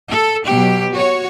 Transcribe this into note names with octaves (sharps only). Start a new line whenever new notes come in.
A4
B2 F#3 G4
F#4 C#5